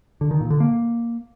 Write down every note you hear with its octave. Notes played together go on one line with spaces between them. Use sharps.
D3
D#3
A#2
D3
A#3